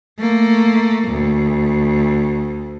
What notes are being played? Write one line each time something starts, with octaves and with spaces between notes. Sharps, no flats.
A3 A#3
D2